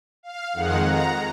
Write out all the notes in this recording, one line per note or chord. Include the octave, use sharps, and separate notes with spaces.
F5
F2 D#3 G#3 F#5
A#5